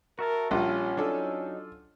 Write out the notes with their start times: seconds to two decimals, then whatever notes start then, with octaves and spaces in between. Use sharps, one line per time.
0.19 F#4 A#4 E5 A5
0.51 A#1 G3 C#4 F4
0.97 F#3 D4 D#4 A4